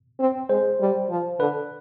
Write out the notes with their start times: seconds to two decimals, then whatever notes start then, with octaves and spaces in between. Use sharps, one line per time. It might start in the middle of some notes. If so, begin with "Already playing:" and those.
0.20 C4
0.49 G#3 C5
0.80 G3
1.10 F3
1.39 D3 B4